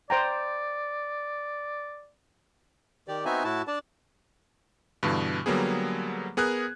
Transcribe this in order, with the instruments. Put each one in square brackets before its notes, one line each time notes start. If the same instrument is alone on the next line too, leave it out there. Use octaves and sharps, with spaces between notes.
[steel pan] C5 G5 A#5 [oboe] D5
[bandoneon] D#3 G4 D5
B3 C4 D#4 F#4 E5 G#5
A2 E4 F#4 A5
D4 D5 A5
[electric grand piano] G2 B2 D3 E3
D3 F#3 G3 A#3 B3 G#4
B3 G#4 A#4 F#6 G#6